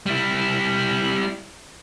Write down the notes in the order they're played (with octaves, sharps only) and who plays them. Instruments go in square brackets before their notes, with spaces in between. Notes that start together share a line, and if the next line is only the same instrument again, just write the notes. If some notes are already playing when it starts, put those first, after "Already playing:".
[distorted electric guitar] G3 E4